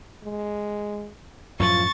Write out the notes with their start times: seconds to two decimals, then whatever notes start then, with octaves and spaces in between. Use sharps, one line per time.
0.23 G#3
1.60 F#2 A2 F3 F4 C#6 A6